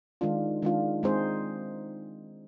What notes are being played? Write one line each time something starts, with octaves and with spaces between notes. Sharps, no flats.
D#3 G#3 D4 F4
D#3 G#3 D4 F4
G#3 C4 D#4 G#4 C5